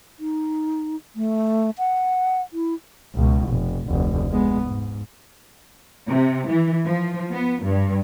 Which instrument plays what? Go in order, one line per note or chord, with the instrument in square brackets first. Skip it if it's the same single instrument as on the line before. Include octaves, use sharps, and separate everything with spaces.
[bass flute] D#4
A3
F#5
E4
[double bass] C#2 B2
F1
F1 D2
G#3 B3
G#2
[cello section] C3
E3
F3
B3
G2